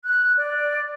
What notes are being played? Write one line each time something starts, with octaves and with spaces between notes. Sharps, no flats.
F#6
D5